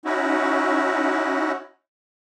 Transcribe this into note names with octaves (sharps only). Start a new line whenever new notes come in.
C#4 D#4 E4 F#4